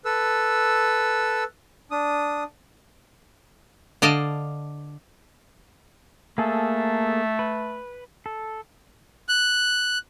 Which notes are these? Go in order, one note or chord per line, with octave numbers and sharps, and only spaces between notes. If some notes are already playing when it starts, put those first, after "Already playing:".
A4 B4 E6
D4 D#6
D3 D5 D#5 F5 A5
A3 A#3 G#4 A4
B4
A4
F#6